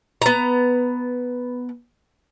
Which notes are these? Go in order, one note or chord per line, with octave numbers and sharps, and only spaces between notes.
B3 A#5